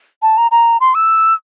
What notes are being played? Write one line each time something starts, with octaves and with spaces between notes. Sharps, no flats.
A5
A#5
A#5
C6
E6